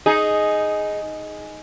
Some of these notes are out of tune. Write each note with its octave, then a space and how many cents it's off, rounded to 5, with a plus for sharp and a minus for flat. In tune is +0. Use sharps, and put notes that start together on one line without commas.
D#4 +0 G#4 +10